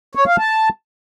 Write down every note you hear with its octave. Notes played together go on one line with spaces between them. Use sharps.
C#5
F5
A5